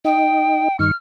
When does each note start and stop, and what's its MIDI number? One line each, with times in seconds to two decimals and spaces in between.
0.05 0.68 63
0.05 0.76 79
0.79 0.91 43
0.79 0.91 51
0.79 0.91 85
0.79 0.95 89